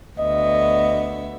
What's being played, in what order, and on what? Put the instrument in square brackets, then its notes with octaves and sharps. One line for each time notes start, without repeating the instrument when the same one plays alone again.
[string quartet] D2 B3 E5 [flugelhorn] D#5